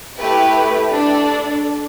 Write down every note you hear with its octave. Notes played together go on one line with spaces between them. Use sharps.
A3 E4 G4 B4
D4 A4 D5